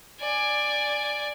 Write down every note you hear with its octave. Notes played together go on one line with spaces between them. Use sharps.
D5 G#5